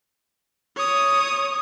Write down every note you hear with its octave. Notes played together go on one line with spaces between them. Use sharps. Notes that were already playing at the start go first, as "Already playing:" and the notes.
C#5 D#6